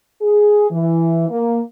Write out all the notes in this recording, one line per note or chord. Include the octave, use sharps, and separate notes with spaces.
G#4
E3
A#3